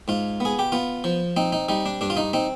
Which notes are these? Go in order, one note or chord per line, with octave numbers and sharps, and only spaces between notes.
G#2 F4
B3 G#4
G4
B3 F4
F3
C4 D#4
D#4
G3 D#4
D4
G2 D4
F4
D#4
C4 D#4